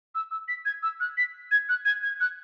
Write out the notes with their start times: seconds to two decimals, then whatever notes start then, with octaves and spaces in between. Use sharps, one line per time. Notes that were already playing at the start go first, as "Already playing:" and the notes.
0.15 E6
0.31 E6
0.48 B6
0.65 G#6
0.83 E6
1.00 F#6
1.17 B6
1.51 G#6
1.69 F#6
1.85 G#6
2.03 G#6
2.20 F#6